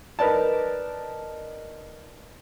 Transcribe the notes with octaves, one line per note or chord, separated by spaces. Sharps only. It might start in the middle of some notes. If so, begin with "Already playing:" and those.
D#4 A#4 B4 D5 A5